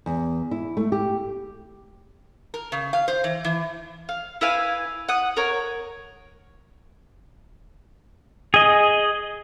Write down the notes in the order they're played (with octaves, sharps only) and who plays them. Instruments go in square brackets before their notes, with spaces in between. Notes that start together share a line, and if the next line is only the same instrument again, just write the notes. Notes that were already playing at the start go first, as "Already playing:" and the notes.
[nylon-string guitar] E2
E4
A3
G4
[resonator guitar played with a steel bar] A#4
C#3
F5
C5
E3
E3
[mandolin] F5
E4 B4 F5 G#5
F#5 D#6
A#4 C#5
[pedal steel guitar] G#4 D#5